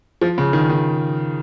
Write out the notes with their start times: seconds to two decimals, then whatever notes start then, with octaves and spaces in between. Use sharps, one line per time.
0.21 F3
0.38 C#3
0.53 D#3
0.69 D#3